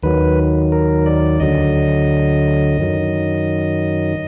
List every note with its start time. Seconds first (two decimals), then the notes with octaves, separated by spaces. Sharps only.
0.03 D#2 D#3 F#3 B4
0.72 A#4
1.06 D5
1.40 D2 D3 F#3 D#5
2.78 F#2 D#3 F#3